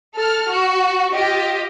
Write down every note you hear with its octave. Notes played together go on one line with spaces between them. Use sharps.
A4 F6
F#4
F4 G4 D#5